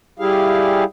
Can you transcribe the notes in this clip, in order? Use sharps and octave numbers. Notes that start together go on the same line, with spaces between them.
G3 E4 G4 G#4 F5